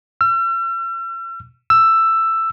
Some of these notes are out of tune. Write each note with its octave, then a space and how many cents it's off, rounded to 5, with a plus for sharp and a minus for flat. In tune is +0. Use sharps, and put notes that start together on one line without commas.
E6 +45
E6 +10